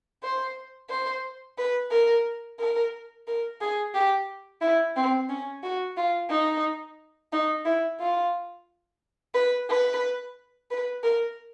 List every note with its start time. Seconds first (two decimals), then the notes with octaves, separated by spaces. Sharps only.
0.23 C5
0.90 C5
1.58 B4
1.91 A#4
2.60 A#4
3.27 A#4
3.61 G#4
3.94 G4
4.61 E4
4.96 C4
5.29 C#4
5.63 F#4
5.97 F4
6.30 D#4
7.33 D#4
7.65 E4
8.00 F4
9.34 B4
9.69 B4
10.71 B4
11.03 A#4